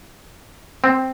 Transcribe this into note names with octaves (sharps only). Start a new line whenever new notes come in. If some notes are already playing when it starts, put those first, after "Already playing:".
C4